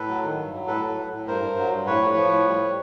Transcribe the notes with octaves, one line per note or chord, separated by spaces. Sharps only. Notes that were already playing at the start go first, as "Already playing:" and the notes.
Already playing: A2 A4 B4
F#3
D#3
G2
F#3
A2 A4 B4
F#3
A2
A2
G2 A#4 C5
G2
F#3
G2
A2 B4 C#5
F3
F3
A2
G3